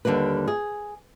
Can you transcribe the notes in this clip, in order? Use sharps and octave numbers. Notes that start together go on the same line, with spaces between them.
D#2 D3 G3 A#3 B4
G#4